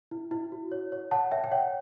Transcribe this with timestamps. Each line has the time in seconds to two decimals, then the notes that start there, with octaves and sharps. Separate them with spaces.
0.11 E4
0.31 E4
0.52 F#4
0.72 C#5
0.92 C#5
1.11 C#5 F#5 A5
1.31 C#5 E5 G5
1.44 G5
1.52 C#5 F#5